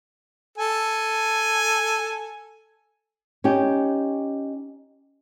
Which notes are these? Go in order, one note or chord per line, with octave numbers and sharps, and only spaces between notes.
A4 G#5
C#4 D#4 G4